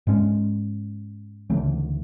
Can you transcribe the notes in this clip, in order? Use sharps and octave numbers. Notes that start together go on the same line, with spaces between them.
G#2 G#3 C#4
D2 C#3 E3 A3